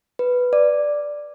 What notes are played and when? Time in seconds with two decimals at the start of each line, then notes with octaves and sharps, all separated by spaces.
0.19 B4
0.53 D5